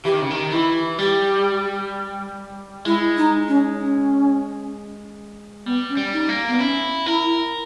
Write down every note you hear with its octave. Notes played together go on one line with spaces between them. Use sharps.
E3 G4
D#3
C#3
D#3
E3 E4
G3 G4
G#3 E4
D#4
C#4
C#4
G3 B3
C#4
G3
D#4
A#3
B3
C#4 E4
E4 A#4